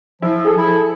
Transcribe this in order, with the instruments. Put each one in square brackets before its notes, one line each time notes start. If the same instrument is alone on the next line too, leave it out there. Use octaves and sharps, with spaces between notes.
[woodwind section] F3 [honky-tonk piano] E4
[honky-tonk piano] G#4 A4
[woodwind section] E4